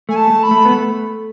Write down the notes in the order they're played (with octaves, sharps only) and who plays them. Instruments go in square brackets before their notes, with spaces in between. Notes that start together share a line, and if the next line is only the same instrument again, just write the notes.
[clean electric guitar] A3 [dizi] G#5
[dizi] A5
[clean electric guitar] A3
[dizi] B5
[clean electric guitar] A3
B3
A3